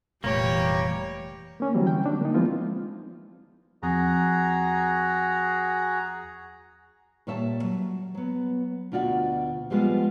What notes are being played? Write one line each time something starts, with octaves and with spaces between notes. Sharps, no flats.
F1 A#2 E3 G3 A3 A#3 G4 C#5
A#3 C#4
D3 E3 F#3 G3 C4
G5
D3 D4
A#3 D#4
F3 G#3 B3 C4 E4 F4
E2 F3 C4 F#4 G#4 A#5
A#2 G3 C#5 E5 G5 A5
F#3
F#3 B3
D2 B2 F4 F#4 D5 F#5
F3 G3 G#3 B3 F4